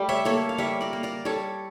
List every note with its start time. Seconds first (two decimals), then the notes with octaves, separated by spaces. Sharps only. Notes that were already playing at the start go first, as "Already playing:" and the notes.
Already playing: G3 A3 G5
0.09 C#5 E5
0.25 A#3 A4 C#5
0.49 F5
0.58 G3 C#5 E5
0.81 A#4 D5
0.93 A#3
1.03 A#4 D5
1.25 G3 A4 C#5